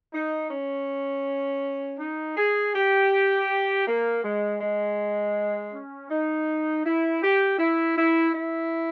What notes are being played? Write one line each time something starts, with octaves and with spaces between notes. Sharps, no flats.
D#4
C#4
D#4
G#4
G4
A#3
G#3
G#3
C#4
D#4
E4
G4
E4
E4
E4